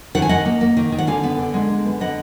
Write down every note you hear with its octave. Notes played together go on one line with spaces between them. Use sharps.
D#3 F#5
G#5
D#3 D#5 F#5
A#3
A#3
D#3
D#3
F#5
D3 F5 G#5
B3
D3
G#3
D3
B3
D3 D#5 F#5